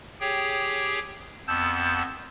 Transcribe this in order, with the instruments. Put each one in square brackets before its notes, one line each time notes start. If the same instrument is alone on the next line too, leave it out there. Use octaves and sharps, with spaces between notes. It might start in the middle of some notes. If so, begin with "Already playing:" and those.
[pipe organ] G4 G#4 C#5 G5
F2 B3 A5 E6 G6